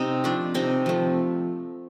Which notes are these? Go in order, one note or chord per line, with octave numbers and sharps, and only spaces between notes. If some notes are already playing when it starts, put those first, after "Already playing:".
Already playing: C3 C4 D#4
F3 A3 D4
C3 C4 D#4
F3 A3